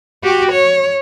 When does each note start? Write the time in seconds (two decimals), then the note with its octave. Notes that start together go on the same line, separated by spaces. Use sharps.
0.23 F#4 G4
0.52 C#5